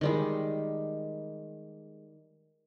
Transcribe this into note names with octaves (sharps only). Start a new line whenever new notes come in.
D#3 G3 G#3